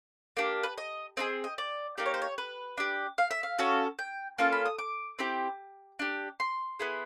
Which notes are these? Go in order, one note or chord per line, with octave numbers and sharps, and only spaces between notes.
A#3 D4 G4
B4
D#5
C4 D#4 G#4 D#5
D#5
D5
A#3 D#4 G4 D5
C#5
C5
C#5
B4
D4 G4
F5
E5
F5
C#4 F#4 A4
G5
A#3 C#4 F4 A4 A5
B5
D#6
D6
C4 E4 G4
D4 G4
C6
B3 E4 G#4